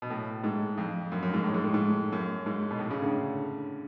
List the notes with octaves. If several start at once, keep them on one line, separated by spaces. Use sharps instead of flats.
B2
A2
G#2
F2
F#2
F#2
G#2
A2
G#2
A2
G#2
F#2
G#2
B2
A2
C#3
D3